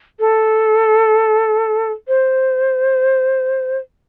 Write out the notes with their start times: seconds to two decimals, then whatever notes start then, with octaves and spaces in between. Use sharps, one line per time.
0.20 A4
2.07 C5